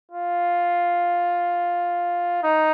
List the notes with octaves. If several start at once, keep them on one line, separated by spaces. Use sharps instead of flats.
F4
D#4